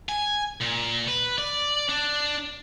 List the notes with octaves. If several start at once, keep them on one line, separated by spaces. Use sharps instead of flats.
G#5
A#2
B4
D5
D4